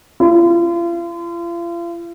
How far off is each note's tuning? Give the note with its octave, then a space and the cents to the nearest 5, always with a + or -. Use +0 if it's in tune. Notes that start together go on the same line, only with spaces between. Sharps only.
F4 -40